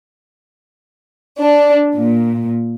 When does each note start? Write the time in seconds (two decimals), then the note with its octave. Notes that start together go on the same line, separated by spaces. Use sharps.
1.40 D4
1.95 A#2